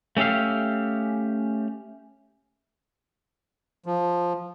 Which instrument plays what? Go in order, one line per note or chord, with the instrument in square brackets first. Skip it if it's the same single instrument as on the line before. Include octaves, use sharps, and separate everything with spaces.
[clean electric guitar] A3 C#4 G4 E5 F5
[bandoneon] F3